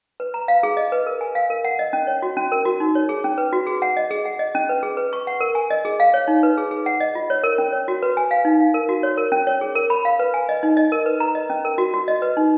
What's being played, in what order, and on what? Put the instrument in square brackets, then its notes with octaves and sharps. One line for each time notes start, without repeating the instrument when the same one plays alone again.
[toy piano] B4
A#5
F5
G#4
D#5
B4
A#4
G#5
F5
A#4
F#5
D#5
C#4
C#5
F#4
C#4
A#4
F#4
D#4
C#5
G#4
C#4
B4
F#4
G#4
F#5
D#5
G#4
F#5
D#5
C#4
B4
G#4
B4
C#6
F#5
A#4
G#5
D#5
G#4
F5
C#5
D#4
B4
G#4
G#4
F#5
D#5
F4
C#5
A#4
C#4
C#5
F#4
B4
G#5
F5
D#4
F5
A#4
F#4
C#5
A#4
C#4
C#5
G#4
A#4
B5
F5
B4
G#5
D#5
D#4
D#5
A#4
B4
A#5
D#5
C#4
A#4
F#4
F#4
D#5
B4
D#4